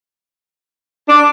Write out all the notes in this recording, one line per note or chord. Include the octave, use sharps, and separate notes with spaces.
D4 D6